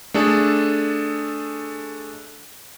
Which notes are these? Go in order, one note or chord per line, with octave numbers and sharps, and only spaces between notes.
A3 D4 G#4 A4